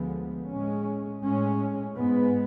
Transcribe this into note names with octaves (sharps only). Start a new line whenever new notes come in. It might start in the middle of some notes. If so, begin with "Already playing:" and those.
Already playing: D2 D3 F3 G#3 B3
A2 G#3 C#4
A2 G#3 C#4
G#2 G#3 B3